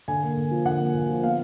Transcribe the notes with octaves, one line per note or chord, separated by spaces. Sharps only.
D3 G#5
A#3
D3
F3
D3 F#5
A#3
D3
F3
B3 F5